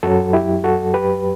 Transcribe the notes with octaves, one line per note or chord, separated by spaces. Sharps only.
F#2 F#3 F#4 A4
E4 G4
F#4 A4
G4 B4